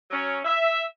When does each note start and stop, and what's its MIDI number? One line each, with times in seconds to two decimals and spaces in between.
0.11 0.38 54
0.11 0.38 61
0.45 0.82 76